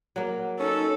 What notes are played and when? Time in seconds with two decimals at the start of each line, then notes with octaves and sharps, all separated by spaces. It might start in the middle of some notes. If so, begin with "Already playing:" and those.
0.16 F#3 A#3
0.60 C#4 D#4 A4